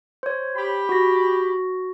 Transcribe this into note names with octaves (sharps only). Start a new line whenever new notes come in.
C5 C#5
G4 B5
F#4 A#6